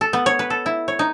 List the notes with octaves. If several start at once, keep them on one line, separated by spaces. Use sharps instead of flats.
A4
B3
C#5
B4
A4
E4
C#5
D#4